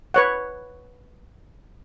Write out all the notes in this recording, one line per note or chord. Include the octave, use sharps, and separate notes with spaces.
B4 C#5 F#5